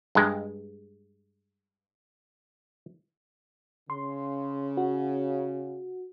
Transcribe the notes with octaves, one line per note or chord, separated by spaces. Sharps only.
G2 G#3
C#3 C6
F#4